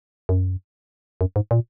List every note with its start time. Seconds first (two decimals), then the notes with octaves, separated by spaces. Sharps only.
0.29 F#2
1.21 F#2
1.36 G#2
1.51 A#2